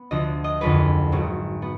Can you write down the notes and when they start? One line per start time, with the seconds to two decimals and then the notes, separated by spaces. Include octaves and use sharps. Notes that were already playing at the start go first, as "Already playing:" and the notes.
Already playing: B3
0.11 D2 D3 F3 D#5
0.44 D#5
0.61 F#1 F2 D3 B4
1.12 G#1 G#2 F#3
1.62 B3